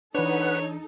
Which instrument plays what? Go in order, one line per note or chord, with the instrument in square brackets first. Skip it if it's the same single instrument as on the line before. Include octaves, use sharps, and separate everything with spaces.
[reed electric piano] E3 D4 [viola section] D#4 A4 [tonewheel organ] B4 F#5 [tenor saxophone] C#5